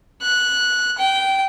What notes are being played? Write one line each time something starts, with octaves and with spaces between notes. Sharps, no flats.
F#6
G5